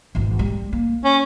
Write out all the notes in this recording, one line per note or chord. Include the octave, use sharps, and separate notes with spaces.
G#1 E2
G3
A#3
C#4